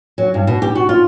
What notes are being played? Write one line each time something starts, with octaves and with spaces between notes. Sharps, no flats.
F#3
G2
B2
G4
F#4
F4